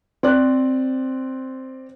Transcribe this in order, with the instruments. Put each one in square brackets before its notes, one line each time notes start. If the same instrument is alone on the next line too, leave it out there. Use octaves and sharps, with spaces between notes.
[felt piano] C4 D5 F#6